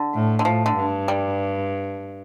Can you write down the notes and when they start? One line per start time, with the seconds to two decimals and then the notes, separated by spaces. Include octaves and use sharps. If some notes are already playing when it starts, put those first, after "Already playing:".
Already playing: D3
0.14 A2
0.39 D3
0.45 A2 F3
0.66 D3
0.76 G2
1.08 G3